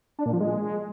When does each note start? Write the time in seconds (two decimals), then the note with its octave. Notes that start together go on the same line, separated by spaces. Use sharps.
0.19 D4
0.26 A#2
0.33 F3
0.40 G#3